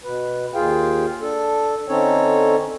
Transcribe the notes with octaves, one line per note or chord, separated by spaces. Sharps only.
B2 B4
D#2 F4 G#4 F5 G5
D4 A4
D3 C4 C#4 D#4 A4 C#5